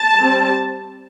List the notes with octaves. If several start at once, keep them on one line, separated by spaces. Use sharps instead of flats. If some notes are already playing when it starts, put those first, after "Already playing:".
Already playing: A5
G3 C4